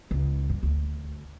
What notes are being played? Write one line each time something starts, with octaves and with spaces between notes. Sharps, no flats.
C#2
G2
D2